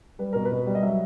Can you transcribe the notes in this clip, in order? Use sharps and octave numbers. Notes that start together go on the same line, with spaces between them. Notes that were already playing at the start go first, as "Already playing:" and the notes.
G3 B4
B2 A#4
B4
B2
G3
D#5
F#3 E5